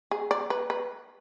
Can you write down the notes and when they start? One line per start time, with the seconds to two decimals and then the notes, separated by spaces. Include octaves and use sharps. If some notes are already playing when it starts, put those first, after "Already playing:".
0.11 G#4
0.31 D5
0.50 B4
0.70 B4